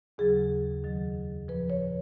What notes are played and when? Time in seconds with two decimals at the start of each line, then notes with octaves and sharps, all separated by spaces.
0.18 D#2 C#3 F#3 G#4
0.83 F2 D#3 F#3
1.48 A#2 F3 B4
1.70 C#5